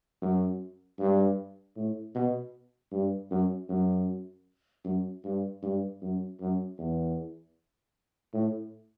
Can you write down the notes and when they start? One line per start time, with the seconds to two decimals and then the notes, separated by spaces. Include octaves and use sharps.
0.22 F#2
0.99 G2
1.76 A2
2.15 B2
2.92 G2
3.31 F#2
3.69 F#2
4.85 F#2
5.24 G2
5.62 G2
6.02 F#2
6.40 F#2
6.79 E2
8.34 A2